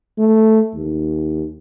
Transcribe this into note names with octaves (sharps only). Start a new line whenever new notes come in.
A3
D#2